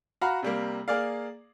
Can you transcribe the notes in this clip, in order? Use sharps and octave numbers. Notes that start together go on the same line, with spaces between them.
F#4 F5 A#5 B5
C3 G3 A#3
A#3 G#4 D5 F5